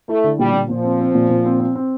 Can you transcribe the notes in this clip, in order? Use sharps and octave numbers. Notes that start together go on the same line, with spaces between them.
A3 E4
D3
A#2 G3
A#2
A#2 F3
C4
C4
A#2
A#2
C4
C4
C4